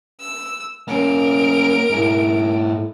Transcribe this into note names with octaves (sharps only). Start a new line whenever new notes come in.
E6
A#3 C#4 A#4 D7
G#2 E4